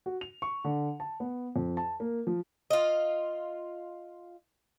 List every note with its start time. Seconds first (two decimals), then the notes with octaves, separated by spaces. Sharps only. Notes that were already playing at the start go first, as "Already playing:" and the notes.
0.06 F#4
0.21 F7
0.42 C#6
0.64 D3
1.00 A5
1.20 B3
1.56 F2
1.77 A5
2.00 A#3
2.27 F3
2.70 F4 D#5